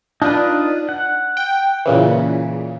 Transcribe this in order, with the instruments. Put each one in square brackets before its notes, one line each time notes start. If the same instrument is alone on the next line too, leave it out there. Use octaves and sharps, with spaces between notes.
[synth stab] D4 [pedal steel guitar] D#4 F4 B4
[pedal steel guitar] F#5
[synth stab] G5
A#2 C#3 E3